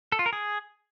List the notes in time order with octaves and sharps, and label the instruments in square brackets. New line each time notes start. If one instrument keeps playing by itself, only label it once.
[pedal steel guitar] A4
F4
A#4
G#4